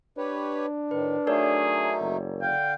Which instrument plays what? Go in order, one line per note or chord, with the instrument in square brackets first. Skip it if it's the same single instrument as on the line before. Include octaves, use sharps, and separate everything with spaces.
[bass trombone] D4 [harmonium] G4 B4 C#5
[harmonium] A2 D#3 [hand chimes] B4
[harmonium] F#3 A3 D#4 [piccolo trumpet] G#4 [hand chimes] A#4 C#5 D5
[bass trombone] F#1
[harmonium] D3 F5 [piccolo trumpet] G5